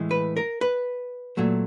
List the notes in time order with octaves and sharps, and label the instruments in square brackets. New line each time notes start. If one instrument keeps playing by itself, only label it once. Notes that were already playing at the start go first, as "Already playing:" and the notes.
Already playing: [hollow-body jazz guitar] A2 E3 G#3
B4
A#4
B4
A#2 F#3 A3